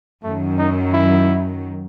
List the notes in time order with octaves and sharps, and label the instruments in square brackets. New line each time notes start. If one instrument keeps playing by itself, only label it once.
[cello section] F#2 D#3 F#3 [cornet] A3
[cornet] D#4
E4